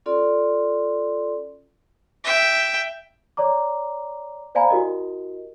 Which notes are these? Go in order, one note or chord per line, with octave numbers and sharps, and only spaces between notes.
C#4 F4 A4 D5 C6
E5 G5
C#5 D5 A#5 D6
C5 D5 F5 G#5 A#5 B5
E4 F#4 G4 A#4 D#5